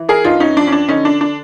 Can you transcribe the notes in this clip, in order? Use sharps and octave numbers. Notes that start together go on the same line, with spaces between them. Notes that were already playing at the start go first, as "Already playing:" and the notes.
Already playing: E3
G#4 A#4
G2 D#4 F4
C#4 D#4
F3 D4
C#4
D4
D3 C#4 D#4
D4
D4